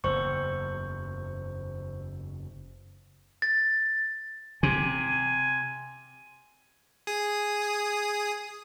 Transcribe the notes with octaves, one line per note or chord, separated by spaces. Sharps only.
F#1 E2 C5 C#6
A6
C3 G#5
G#4 D#6